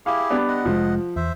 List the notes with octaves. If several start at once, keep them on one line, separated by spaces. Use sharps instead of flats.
E4 G4 G#4 F5
G3 B3 D4
D#5 F#5
F1 F3 G#3
E2 C5 E5